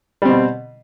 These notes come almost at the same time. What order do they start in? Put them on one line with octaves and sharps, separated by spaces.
G3 C4 B2